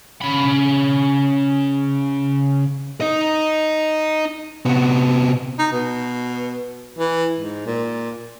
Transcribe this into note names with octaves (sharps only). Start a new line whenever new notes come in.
C#3 B5
D#4 D#5
C3 B3
D#4
B2
E3
G#2
A#2